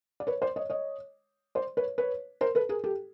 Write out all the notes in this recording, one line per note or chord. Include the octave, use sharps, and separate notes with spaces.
D5
B4 C#5
C5 D5
C#5 D#5
C#5 D#5
C5 D5
B4 C#5
B4 C#5
A#4 C5
A4 B4
G#4 A#4
G4 A4